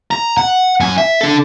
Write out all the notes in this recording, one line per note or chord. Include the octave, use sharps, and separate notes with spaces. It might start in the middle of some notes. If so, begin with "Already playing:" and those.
A#5
F#5
F#2 G#5
E5
D4 A4